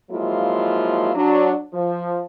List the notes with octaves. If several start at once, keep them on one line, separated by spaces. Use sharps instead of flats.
F3 F#3 G#3 A#3 E4 F4
F#3 D4
F3